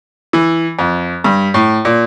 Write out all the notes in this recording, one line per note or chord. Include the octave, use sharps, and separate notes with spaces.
E3
F2
G2
A2
A#2